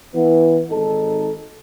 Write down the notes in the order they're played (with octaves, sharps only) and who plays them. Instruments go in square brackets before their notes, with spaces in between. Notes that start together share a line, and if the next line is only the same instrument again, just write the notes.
[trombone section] E3 B3
G#1 D#4 A4